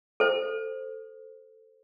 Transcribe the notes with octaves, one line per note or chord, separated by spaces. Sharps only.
A4 C5